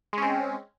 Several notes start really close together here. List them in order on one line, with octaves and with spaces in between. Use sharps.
G#3 C#4 C4